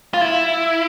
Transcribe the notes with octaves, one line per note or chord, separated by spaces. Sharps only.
F4
E4